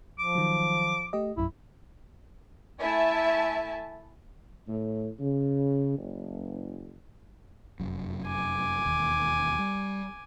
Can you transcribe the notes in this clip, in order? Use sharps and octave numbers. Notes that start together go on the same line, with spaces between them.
F3 D6
D#3 F#3
A3 G4 D#5
A#1 F#2 E4
A3 E4 E5 G#5 A5
A2
C#3
F#1
F1 F#2
G#5 D6
E1 D#2
G3